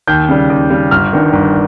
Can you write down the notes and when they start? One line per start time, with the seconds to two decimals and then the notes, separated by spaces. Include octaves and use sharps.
0.07 D#2 G6
0.29 C#3 G3
0.50 D#2
0.70 C#3 G3
0.91 G1 F6
1.13 G2 D#3
1.33 G1